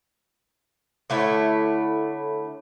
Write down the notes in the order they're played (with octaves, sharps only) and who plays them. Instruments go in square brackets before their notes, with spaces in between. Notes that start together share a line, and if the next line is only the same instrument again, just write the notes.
[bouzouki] D3 A3 E4 C#5